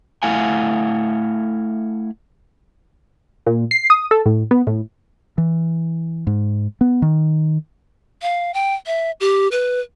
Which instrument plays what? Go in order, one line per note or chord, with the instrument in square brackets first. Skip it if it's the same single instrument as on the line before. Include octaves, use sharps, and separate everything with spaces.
[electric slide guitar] A3 E4 F5 F#5 G#5
[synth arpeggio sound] A#2
C7
D#6
A4
A2
B3
A2
[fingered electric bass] E3
G#2
B3
D#3
[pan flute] F5
G5
E5
G4
B4